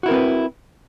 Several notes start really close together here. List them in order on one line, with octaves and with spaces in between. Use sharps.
F#4 E4 A#4 C4 B4